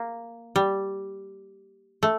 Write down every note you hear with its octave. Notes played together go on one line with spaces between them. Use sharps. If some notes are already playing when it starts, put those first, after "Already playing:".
Already playing: A#3
G3
A3